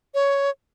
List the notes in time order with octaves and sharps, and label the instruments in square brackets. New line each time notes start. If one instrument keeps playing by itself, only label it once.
[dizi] C#5